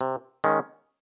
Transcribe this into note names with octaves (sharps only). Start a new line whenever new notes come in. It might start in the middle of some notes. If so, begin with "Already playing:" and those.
C3
D#3 G#3 C#4